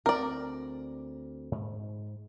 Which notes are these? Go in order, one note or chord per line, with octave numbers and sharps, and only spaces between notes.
D2 C4 A#4 D5
G#2